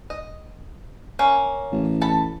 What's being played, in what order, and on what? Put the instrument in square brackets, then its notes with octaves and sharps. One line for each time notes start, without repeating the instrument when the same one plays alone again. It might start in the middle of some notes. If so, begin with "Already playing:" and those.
[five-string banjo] D#5
A#3 C#4
[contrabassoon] A1
[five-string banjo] A4 A5 B5